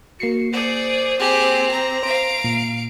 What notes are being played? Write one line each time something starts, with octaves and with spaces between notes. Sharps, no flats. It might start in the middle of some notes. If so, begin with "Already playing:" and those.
A#3 F#4 C7 C#7
G#4 C5 D5
C4 G4 G#4
A#5
C5 F5 D7
A#2